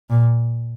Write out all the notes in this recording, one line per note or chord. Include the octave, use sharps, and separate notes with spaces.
A#2